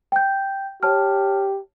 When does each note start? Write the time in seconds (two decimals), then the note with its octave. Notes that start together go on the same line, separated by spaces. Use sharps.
0.12 G5 G6
0.83 G4 C#5 A5 F6